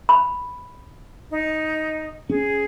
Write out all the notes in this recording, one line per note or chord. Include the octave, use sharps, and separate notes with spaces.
B5
D#4
C#4 G#4